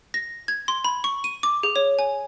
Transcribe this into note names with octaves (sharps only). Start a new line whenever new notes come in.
A#6
G#6
C6
B5
C#6
D#7
D6
G#4
C#5
G#5